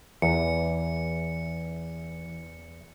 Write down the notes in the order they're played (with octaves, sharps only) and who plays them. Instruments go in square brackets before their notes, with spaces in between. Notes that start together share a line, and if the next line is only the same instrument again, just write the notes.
[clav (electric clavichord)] E2 [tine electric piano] E3 [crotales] C#7